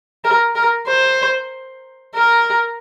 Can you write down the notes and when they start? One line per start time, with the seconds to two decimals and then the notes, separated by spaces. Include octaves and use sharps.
0.24 A#4
0.55 A#4
0.87 C5
2.15 A#4